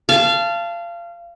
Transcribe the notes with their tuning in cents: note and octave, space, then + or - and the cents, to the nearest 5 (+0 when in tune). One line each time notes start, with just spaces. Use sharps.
F5 -25 A5 +0